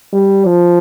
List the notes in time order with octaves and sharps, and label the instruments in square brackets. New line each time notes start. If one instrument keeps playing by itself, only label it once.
[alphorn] G3
F3